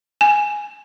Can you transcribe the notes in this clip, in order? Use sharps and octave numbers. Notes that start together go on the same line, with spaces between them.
G#5